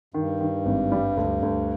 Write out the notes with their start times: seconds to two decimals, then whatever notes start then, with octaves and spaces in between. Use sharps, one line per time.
0.14 G2 D#3
0.41 D#3
0.66 G#1
0.92 G3
1.17 D2
1.42 D2